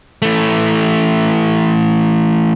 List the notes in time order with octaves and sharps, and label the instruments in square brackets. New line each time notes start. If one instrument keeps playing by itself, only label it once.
[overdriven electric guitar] E3 A3